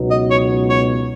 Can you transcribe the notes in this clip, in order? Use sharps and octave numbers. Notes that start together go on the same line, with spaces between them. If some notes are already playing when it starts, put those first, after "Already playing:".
Already playing: C#2 B2 F#3 B3 D#4
D#5
C#5
C#5